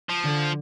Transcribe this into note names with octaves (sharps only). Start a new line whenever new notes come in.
F3
D3